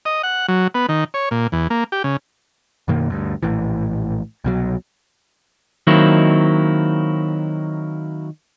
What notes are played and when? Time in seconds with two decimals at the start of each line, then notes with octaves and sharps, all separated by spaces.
0.05 D#5
0.23 F#5
0.48 F#3
0.74 B3
0.89 D#3
1.14 C#5
1.31 A#2
1.52 E2
1.70 A#3
1.92 G4
2.04 C#3
2.88 F#2 B2 D#3 A#3
3.10 D2 G2
3.43 A#1 A2 E3
4.44 C2 B2 F#3
5.87 D#3 F#3 A#3 C4 D#4 E4